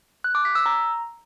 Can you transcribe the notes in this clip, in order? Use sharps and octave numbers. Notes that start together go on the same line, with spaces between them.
F#6
D6
B6
E6
A#5